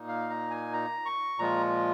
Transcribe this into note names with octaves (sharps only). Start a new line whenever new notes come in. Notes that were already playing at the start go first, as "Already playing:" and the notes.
Already playing: A#2 A#3 D#4
F5
A#5
G#5
A#5
C#6
A#2 F3 G#3 F4 A#5